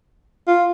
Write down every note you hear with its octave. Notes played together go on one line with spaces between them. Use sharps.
F4